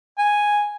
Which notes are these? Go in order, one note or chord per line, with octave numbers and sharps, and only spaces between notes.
G#5